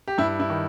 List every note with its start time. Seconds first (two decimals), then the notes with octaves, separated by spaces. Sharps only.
0.08 G4
0.18 G2 E4
0.40 E4
0.50 D#3